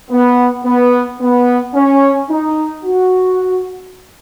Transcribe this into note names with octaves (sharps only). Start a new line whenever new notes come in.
B3
B3
B3
C#4
D#4
F#4